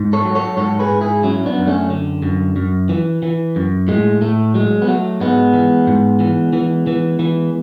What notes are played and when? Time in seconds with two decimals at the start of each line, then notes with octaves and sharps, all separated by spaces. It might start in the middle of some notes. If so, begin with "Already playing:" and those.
Already playing: G#2
0.13 A4 C#5
0.25 F#3
0.35 A4 C#5
0.57 G#2 A4 C#5
0.79 G#4 B4
0.91 G#2
1.01 E4 G#4
1.23 F#3 C#4 E4
1.46 B3 D4
1.57 F#2
1.67 A3 C#4
1.90 D3
2.22 F#2
2.56 F#2
2.89 E3
3.23 E3
3.56 F#2
3.88 A2 G#3
4.21 A2 A3
4.54 F#3 G#3
4.82 B3
4.88 F#3 A3
5.21 G#2 G#3 B3
5.54 E3
5.87 G#2
6.20 E3
6.53 E3
6.87 E3
7.19 E3